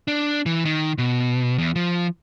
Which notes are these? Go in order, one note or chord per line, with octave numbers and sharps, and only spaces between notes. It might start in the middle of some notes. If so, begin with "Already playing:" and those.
D4
E3
D#3
B2
E2
F3